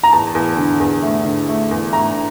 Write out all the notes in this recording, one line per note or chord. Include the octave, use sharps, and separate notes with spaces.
A#5
E2 A5
E2
D3
E2
A3
D3
A3
E2
A3 A#5